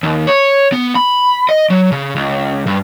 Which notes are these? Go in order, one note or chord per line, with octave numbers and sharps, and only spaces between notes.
D#2
C#5
B3
B5
D#5
F#3
C#3
C#2
G2